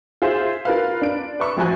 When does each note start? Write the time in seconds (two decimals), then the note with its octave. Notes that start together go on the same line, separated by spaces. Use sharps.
0.22 F4 G#4 C5 E5
0.65 F4 A#4 B4 F5
1.02 D4 D7
1.40 B4 E5 C#6
1.57 A1 F3 F#4 G#5 F#6